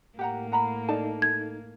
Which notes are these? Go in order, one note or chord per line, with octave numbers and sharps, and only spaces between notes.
A2 A#3 G4 F#5 A#5
F#5 A#5 B5
D#4 A4 D5 A5
G#6